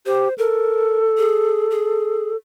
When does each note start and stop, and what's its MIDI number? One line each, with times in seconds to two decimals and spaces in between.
0.06 0.28 67
0.06 0.34 72
0.38 2.36 69
0.38 1.00 70
1.17 1.67 68
1.70 2.30 68